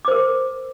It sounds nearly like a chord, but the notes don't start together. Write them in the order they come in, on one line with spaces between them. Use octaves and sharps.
D6 C5 A#4